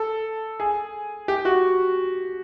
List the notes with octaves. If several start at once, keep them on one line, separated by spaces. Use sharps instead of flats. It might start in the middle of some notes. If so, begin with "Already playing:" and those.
Already playing: A4
G#4
G4
F#4